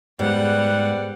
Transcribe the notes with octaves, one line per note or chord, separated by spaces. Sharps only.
G#2 G3 B3 F#5